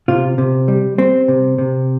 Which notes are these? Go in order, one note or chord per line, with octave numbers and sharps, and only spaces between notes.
C3 F4
C3
G3
G3 C4
C3
C3